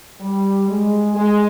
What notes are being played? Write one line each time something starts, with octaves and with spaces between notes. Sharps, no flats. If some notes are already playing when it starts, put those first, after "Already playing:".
G3
G#3
G#3